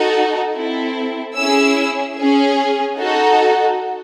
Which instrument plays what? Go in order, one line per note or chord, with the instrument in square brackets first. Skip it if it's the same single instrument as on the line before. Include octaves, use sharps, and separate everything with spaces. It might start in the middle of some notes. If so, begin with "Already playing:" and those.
Already playing: [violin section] D#4 F#4 A4
C4 E4 A4
C#4 E4 G#4 E6
C#4 G#4
D#4 F#4 A4